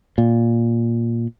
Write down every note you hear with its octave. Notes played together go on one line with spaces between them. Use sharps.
A#2